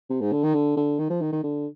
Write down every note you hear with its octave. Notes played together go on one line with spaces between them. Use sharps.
C3
G#2
D3
D#3
D3
D3
D#3
F3
D#3
D#3
D3